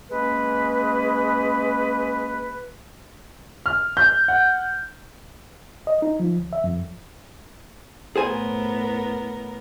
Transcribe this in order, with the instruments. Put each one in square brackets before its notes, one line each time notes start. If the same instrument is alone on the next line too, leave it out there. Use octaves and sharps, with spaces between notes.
[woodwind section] G#3 A#3 C#4 B4
[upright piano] F6
G6
F#5
[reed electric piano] D#5
D#4
F3
D2
E5
F2
[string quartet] A2 B3 A#4 [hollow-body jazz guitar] G#4 C5 G#5